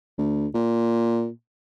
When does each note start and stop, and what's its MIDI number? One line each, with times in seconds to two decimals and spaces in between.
0.18 0.47 38
0.54 1.29 46